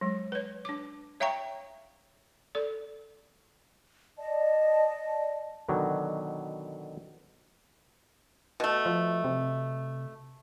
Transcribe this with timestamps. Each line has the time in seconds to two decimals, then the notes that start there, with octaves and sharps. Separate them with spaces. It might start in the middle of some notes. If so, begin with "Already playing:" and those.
0.01 F#3 G#3
0.32 B4 C#5
0.65 D4 D6
1.20 C#5 E5 F5 G5 A#5 C#6
2.55 A4 D5
4.18 D5 D#5 A5
5.69 B2 D3 D#3 F#3
8.60 B2 A3
8.86 F3
9.24 C3